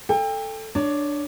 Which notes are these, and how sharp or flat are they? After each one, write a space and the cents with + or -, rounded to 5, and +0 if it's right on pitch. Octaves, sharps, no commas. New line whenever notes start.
A4 +0 G5 +30
D4 +5 C#5 +20